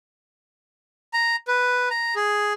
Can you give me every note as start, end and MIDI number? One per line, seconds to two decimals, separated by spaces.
1.13 1.36 82
1.48 1.89 71
1.91 2.14 82
2.16 2.53 68